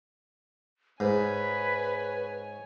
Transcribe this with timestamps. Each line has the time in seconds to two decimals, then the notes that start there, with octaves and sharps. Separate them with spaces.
1.00 G#2 B4 C#5 G#5